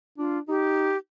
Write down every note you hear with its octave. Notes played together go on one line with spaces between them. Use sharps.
D4 F4
D#4 G4